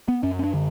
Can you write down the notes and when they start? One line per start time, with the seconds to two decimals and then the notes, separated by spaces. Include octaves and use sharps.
0.08 B3
0.23 F#2 C#4
0.39 C#4
0.44 D4
0.54 D3